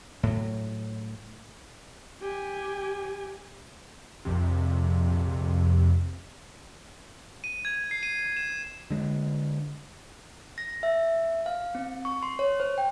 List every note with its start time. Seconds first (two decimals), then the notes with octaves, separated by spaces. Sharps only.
0.23 A2 F#3
2.22 G4 G#5
4.25 A#1 F2 C3
7.44 D#7
7.65 G#6
7.91 C7
8.03 D#7
8.37 E7
8.90 D3 G#3
10.58 A#6
10.83 E5
11.46 F5
11.75 C4
12.05 C#6
12.23 C6
12.39 C#5
12.60 C5
12.78 G5